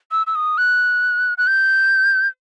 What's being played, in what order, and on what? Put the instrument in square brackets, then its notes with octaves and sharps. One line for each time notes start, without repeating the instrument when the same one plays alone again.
[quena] E6
E6
D#6
F#6
F#6
G6